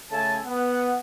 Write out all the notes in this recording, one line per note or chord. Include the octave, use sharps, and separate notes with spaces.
C#3 A3 A4 E5 G#5 A5
B3 F#5